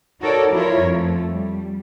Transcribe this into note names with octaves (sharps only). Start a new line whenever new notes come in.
D#4 F#4 A4 A#4 C#5 D5
F3 E4 F4 A#4 C#5
F2 F3 A3
G3